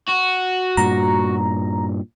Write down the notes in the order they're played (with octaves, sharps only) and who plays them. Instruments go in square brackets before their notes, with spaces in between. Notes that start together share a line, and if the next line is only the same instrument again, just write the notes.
[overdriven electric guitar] F#4
[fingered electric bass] G2 A#2 [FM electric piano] A#5